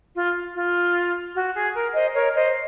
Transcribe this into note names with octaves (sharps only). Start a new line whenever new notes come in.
F4
F4
F#4
G#4
A#4
C5 D#5
A#4 C#5
C5 D#5